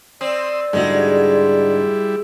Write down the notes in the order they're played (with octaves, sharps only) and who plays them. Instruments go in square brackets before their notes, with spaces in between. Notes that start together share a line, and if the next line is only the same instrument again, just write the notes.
[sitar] C4 [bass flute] D5 [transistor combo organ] C6 D#6 E6
[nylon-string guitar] G#2 D3 F#4 [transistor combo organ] G3 E4 [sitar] G#3